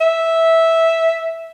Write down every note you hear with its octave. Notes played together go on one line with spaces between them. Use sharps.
E5